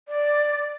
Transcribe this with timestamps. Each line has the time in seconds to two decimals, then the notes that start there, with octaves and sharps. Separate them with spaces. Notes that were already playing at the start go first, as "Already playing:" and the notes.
0.08 D5